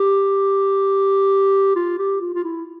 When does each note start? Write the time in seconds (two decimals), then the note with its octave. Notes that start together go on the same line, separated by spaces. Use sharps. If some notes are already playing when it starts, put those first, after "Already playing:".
Already playing: G4
1.76 F4
1.99 G4
2.21 F4
2.34 F4
2.44 E4